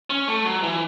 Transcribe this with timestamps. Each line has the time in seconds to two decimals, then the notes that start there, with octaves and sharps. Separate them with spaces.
0.10 C#4
0.28 A3
0.45 F#3
0.63 E3